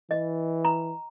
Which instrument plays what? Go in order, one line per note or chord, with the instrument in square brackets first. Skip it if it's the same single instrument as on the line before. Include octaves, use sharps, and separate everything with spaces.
[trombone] E3 [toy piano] D#5
[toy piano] A#5